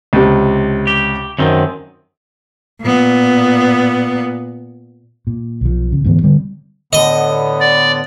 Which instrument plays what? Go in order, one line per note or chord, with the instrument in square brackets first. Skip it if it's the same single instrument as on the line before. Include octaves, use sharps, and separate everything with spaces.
[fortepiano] C#2 C3
[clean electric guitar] G4
F#2 D#3 C4
[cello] A#2 B3
[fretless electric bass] A#2
B1 F3
C#3
D2 G#2 E3 B3
D3 G3 C4
[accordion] A2 D3 B3 [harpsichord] D#5
[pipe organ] D5